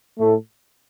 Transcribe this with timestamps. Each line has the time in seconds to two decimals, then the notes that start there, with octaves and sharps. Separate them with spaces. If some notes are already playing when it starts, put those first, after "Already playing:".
0.19 A2 A3